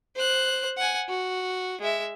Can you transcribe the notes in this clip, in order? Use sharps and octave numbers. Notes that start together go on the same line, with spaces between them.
C5 F#6
F#5 G#5
F#4
G#3 E5